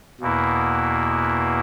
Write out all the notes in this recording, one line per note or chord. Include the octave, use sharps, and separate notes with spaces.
E2 B2 A#3 E4